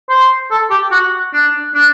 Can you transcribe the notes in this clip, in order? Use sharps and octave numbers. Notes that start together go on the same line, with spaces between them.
C5
A4
G4
F#4
D4
D4